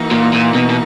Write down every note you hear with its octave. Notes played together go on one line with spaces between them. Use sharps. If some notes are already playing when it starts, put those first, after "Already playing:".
Already playing: E3 A#3 D#4 F#4
A#2
A#2
B2
B2